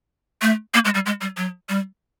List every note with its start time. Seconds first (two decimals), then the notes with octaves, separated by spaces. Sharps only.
0.42 A3
0.74 A#3
0.85 G#3
0.94 G3
1.06 G#3
1.21 G3
1.37 F#3
1.69 G3